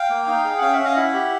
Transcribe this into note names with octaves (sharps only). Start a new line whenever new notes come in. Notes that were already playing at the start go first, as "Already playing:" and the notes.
Already playing: F5 G5
A#3
D#4
G#4
F#5
C#4 F5 G5
E5 F#5
C#4
D#5 F5
E4 E5 F#5
G4